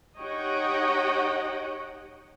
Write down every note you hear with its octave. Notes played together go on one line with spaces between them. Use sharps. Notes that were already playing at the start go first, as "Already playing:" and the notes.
D#4 G4 C#5 D#5 F#5 G5